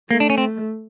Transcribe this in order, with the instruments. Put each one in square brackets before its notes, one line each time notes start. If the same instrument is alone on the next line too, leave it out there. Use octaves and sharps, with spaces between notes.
[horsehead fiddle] A3 [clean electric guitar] A#3
[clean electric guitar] D4
C#4
C4